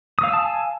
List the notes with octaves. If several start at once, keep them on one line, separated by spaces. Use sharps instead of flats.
F5 G#5 A5 D#6 E6